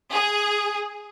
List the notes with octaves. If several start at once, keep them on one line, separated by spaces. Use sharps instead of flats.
G#4